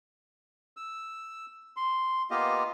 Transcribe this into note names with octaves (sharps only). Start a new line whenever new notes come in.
E6
C6
A#3 B3 F4 G4 D#5 F5